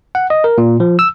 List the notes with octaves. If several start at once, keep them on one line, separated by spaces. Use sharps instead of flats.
F#5
D#5
A#4
A#2
F3
E6